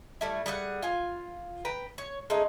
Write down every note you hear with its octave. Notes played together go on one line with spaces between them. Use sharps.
G3 A3 E4
G3 G#4 F5 F#5
F4 G#5
B4 G5 A#5
C#5
G#3 A3 C#4 D#4